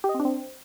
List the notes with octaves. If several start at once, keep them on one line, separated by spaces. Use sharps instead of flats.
G4
D#5
C4
D4
C4